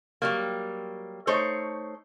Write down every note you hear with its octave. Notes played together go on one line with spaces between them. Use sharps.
F#3 G3 A#3
A3 D#4 C5 C#5